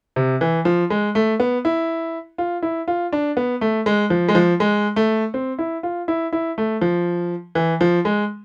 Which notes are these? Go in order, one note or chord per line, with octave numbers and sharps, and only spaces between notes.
C3
E3
F3
G#3
A3
B3
E4
F4
E4
F4
D4
B3
A3
G#3
F3
G#3
F3
G#3
A3
C4
E4
F4
E4
E4
A3
F3
E3
F3
G#3